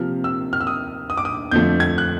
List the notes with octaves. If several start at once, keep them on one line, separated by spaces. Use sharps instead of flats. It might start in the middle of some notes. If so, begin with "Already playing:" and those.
Already playing: C3 F3 A#3 F6
E6
F6
E6
D#6
D#6
D6
D#6
F2 D3 F3 A3 G6
G#6
F#6